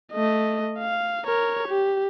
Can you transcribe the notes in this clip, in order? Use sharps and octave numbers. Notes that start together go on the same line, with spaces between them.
A3 D#5
F5
A#4 C#5
G4